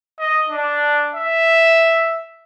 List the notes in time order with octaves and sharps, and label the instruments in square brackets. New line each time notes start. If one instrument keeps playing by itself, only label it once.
[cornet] D#5
D4
E5